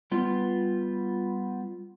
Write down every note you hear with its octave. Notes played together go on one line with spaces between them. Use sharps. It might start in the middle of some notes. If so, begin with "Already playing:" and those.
G3 B3 F4